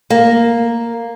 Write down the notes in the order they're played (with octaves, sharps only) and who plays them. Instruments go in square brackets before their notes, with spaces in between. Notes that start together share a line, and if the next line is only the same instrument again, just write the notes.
[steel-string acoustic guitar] A#3